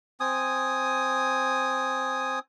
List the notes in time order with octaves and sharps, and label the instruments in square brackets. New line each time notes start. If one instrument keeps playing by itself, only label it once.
[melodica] C4 G#5 D#6